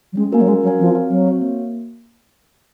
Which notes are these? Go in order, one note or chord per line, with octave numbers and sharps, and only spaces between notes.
F#3
G#3 C#4
A#3 F#4 A#4 F5 G#5
F#3
G#3 C#4
F#3 F#4 A#4 F5 G#5
F3 C4
F#4 C#5 F5
F#3 C4
F#4 C#5 F5
A#3